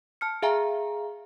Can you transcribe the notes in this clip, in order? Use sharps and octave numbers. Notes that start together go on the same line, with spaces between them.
A5 F6 C#7
G#4 E5 F5 G#5 A#5